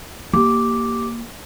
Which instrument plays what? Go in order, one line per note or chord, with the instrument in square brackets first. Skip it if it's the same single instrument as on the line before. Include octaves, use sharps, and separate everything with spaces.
[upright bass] A#3 [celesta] G4 D6